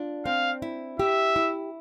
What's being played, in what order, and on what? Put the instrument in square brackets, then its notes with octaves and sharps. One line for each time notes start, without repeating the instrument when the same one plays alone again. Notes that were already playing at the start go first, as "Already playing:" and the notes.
Already playing: [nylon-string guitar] D4 F4
[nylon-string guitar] C4 [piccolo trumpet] F5
[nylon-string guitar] E4
[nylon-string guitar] G4 [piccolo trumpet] E5
[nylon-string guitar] E4